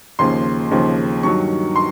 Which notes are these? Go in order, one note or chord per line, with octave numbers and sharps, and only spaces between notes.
D#2 C#3 F3 A#3 C6
D#2 C#3 F3 A#3
G2 D#3 F#3 C#6
C6